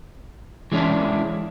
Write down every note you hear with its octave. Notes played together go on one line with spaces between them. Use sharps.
E3 G#3 C#4 D4 E4